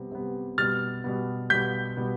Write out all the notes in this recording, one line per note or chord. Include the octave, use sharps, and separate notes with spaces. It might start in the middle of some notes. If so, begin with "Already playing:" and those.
Already playing: C3 G3 B3
C3 G3 B3
B2 G3 B3 F6 A6
B2 G3 B3
B2 G3 B3 G6 B6
B2 G3 B3